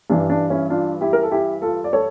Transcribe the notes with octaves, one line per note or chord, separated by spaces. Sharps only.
G2 E3 G3 D4
D4
C#4 E4
D4 F4
E4 G4
A#4
A4
E4 G4
F4 A4
D5
A4 C#5